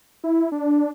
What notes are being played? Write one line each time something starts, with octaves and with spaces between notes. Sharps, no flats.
E4
D4